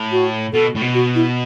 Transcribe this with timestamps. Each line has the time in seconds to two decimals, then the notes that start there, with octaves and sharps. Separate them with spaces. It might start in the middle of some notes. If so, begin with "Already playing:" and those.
Already playing: A2
0.12 F#4
0.53 B2 A4
0.75 A2
0.82 B2
0.94 F#4
1.15 E4